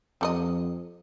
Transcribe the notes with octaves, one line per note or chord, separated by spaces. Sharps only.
F2 G3 A4 D#5